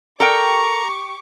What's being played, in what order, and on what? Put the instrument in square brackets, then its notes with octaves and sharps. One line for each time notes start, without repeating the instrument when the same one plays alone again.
[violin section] G4 C#6 D6 [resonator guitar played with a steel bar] A4 A#4 G5 [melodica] A#5